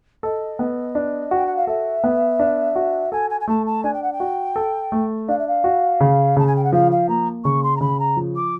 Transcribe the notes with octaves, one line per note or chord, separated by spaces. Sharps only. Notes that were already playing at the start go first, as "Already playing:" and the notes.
A4 D#5
B3
D4
F#4 G5
F#5
F5
A4 E5
B3
D4
F#4
A4 G#5
G#5
G#5
A3 A5
A5
D4 G#5
G5
F#5
G5
F#4
A4
A3
D4 F5
E5
F5
F#4
C#3
C#3 A5
G#5
G5
F#5
F3 F5
F5
A#3 A#5
C#3 C#6
C6
A#5
C#3 B5
A#5
F3
D6